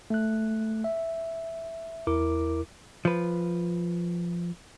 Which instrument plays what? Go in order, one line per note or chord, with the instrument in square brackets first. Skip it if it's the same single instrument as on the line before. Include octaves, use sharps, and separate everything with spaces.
[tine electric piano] A3 F#6
E5
E2 E4 A#4 D6
[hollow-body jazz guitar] F3 B4